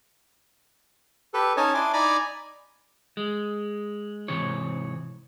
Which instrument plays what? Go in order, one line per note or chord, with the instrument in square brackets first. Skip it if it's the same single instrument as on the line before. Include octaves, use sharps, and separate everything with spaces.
[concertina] G4 A4 B4
C#4 D#4 C#5 D#5 G#5 A5
D4 E4 G#5 C6 D6
D#4 D5 G#5 A#5 B5 D6
[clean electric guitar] G#3
G#2 C3 E3 C#5